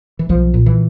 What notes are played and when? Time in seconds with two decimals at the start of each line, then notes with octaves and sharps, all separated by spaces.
0.19 E3
0.29 B1 F3
0.54 A#2
0.66 E3